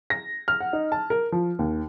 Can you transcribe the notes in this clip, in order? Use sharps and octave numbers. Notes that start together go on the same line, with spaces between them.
A#6
F6
F#5
D#4
A5
A#4
F3
D#2